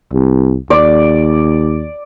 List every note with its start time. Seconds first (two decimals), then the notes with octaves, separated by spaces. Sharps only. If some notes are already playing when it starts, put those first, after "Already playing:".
0.13 C2
0.70 D#2 D5